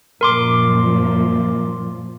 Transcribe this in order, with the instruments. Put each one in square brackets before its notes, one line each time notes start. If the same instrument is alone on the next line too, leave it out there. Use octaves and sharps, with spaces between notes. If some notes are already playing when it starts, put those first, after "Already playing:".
[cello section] F#2 A#2 F3 [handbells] A#4 C6 D6